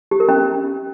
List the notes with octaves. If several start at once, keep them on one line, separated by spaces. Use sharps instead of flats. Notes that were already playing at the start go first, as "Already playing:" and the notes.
G4
A#4
C#4